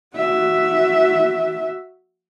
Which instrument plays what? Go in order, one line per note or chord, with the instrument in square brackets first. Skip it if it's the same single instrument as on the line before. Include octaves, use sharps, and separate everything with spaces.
[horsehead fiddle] F#4 E5